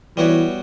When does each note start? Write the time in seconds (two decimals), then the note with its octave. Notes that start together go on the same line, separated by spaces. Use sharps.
0.17 E3 G3 B3 F#4 C#5